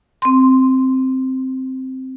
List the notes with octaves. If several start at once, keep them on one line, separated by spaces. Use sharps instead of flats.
C4 C6